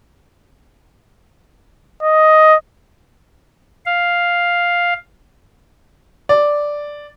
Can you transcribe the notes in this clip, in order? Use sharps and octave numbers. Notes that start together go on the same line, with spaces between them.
D#5
F5
D5